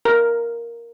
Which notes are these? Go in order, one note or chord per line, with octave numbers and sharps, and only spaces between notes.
A#4